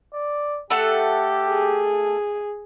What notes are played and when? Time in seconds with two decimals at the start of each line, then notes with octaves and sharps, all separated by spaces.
0.13 D5
0.70 A3 G4 A4 F#5
1.48 G#4